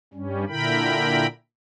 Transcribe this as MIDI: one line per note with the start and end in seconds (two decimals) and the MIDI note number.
0.14 0.45 43
0.14 0.45 55
0.14 0.45 61
0.48 1.26 46
0.48 1.26 50
0.48 1.26 64
0.48 1.26 70
0.48 1.26 79
0.48 1.26 83